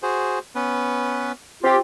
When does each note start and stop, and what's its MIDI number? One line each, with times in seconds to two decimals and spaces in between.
0.03 0.39 66
0.03 0.39 68
0.03 0.39 72
0.55 1.32 59
0.55 1.32 61
0.55 1.32 71
1.63 1.77 60
1.63 1.77 65
1.63 1.77 67